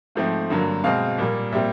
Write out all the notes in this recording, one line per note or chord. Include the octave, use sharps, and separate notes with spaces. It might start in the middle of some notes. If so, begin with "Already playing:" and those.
G#2 F3 A3 C4
G2 D3 F#3 A#3
B2 G#3 C4 F5
A#2 G3 A#3
A#2 G3 C4 E5